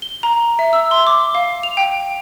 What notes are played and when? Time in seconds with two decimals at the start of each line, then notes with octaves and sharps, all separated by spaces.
0.02 G7
0.23 A#5
0.59 E5
0.73 E6
0.91 C6
1.07 D6
1.35 F5
1.63 F7
1.77 G5